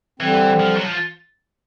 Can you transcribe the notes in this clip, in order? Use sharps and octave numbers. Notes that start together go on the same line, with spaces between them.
D3 E3 G3 C4
F3
F#3
F3